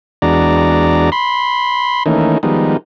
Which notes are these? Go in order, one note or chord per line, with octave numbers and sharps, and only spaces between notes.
E2 G#3 D4 F#4 D5 A#5
B5 C6
D#3 E3 A3 A#3 C#4 D#4
D#3 F3 G3 G#3 B3 D#4